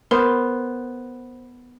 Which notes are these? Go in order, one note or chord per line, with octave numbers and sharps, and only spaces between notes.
B3 A#4 C5